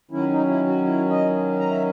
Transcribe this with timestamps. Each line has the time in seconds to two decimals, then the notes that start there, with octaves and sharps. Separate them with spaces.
0.11 D#3 F#3 C#4 E4
0.29 D#4
0.48 E4
0.67 F#4
0.85 E4
1.10 D#5
1.59 A#5
1.71 E5